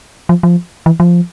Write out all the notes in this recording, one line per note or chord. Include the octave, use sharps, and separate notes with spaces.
F3
F3
E3
F3